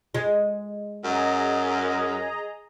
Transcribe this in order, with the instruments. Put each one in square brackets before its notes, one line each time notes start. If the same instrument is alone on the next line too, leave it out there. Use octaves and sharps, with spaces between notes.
[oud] G#3
[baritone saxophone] F#2 [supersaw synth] G#4 D#5 A#5